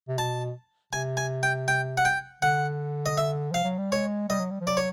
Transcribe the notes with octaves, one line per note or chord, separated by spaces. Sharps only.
C3
B2 A5
C3 G#5
G#5
G5
G5
F#5
G5
D3 F#5
D#5
E5
F3 F5
F#3
G3
G#3 C#5
G3 D#5
F#3
G3
F3
F#3 D5
C#5